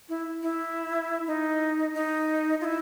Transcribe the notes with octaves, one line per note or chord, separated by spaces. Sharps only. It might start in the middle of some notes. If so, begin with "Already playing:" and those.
E4
E4
D#4
D#4
F4
E4